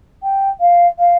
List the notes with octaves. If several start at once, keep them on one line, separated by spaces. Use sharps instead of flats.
G5
F5
F5